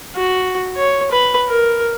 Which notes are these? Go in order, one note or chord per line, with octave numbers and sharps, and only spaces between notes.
F#4
C#5
B4
A#4